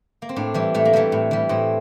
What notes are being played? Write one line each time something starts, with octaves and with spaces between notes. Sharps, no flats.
A#3
C4
A2 D4
E3 G3
A2 A3
A#3
E3 G3 A3
A2
E3 G3
A2 C4